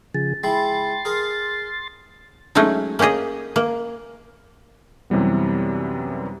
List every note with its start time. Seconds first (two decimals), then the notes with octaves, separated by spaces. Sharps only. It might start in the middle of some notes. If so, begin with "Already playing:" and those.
0.15 C#3 F3 G#4 A6
0.43 G#3 E4 G5 B5 C6 A6
1.05 G#4 A#4 D#6 F6
2.55 F#3 G#3 A3 C#4 D#4
2.99 A#3 C#4 G4 G#4 D#5
3.56 A#3
5.10 F#2 C3 E3 G3 B3